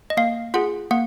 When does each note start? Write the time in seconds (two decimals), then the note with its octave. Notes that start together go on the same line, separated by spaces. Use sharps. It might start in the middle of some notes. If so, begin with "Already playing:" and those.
0.10 D#5
0.17 A#3 F5
0.54 F4 G#4 F#5
0.91 A#3 F#5